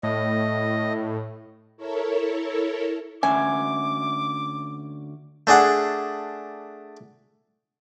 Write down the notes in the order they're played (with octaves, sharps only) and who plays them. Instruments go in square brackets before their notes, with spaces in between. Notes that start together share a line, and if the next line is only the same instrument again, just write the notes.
[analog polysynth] A2 [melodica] D#5
[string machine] E4 A4 A#4 C#5
[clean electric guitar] D2 C#4 E5 [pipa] G#5 [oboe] D6
[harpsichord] A3 D4 G#4 F#5